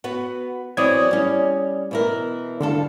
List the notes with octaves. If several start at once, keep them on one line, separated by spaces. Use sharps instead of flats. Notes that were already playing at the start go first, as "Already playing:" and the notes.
B3 F#4 B4
E3 F#3 C4 D5 D#6 G#6
G3 C#4
B2 E3 A#4
G2 D3 F4 A4